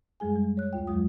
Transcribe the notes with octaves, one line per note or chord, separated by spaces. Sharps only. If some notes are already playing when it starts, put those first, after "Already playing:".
F#2 G3 G#3 G#4 G#5
G3
C#5 F#6
D2 F4 G5
F2 F#3 G#3 F4 D#6